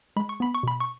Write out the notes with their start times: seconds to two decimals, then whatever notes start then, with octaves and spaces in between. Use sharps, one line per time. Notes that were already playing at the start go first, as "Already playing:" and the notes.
0.16 G#3 B5
0.29 C#6
0.40 B3 B5
0.55 C#6
0.63 B2 B5
0.80 C#6